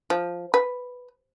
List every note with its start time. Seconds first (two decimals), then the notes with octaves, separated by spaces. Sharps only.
0.10 F3
0.54 B4